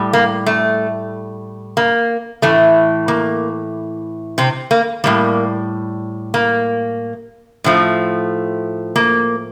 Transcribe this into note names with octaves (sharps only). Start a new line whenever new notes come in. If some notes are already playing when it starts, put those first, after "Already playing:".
Already playing: A2 G3
A#3
A3
A#3
A2 E3 A3
A#3
C3 C4
A#3
A2 E3 G3 A#3
A#3
A2 F3 A3
A#3